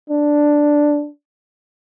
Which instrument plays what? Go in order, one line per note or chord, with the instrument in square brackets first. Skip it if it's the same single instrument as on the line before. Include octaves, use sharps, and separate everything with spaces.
[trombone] D4